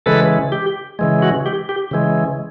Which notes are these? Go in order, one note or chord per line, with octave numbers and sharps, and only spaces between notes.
C#3 E3 G#3 A4 B4
G4
C#3 E3 G#3
F#4
G4
G4
C#3 E3 G#3